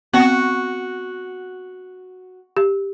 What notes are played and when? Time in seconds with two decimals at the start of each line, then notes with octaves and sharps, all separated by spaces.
0.13 B3 C4 F#4 F#5
2.57 G4